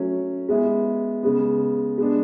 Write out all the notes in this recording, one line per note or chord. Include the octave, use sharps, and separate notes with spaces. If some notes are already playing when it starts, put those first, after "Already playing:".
Already playing: F#3 A3 C#4
G#3 B3 E4 G#4
C#3 G#3 B3
G#3 B3 D4